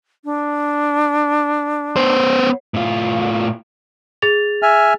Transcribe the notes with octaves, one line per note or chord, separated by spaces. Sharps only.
D4
B3 C5
A2 F4
G#4 A6 F7
E5 G#5 F6